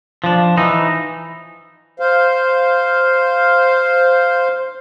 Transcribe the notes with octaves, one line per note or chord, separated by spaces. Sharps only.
F3 D4
E3 D#4
C5 F5